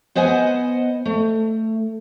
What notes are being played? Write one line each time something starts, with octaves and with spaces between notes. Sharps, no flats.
B3 C5 D#5 F#5 G#5
A3